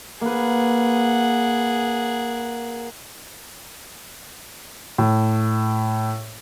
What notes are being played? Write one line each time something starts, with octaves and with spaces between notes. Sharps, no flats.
A#3 G#4 B4 F#5
A2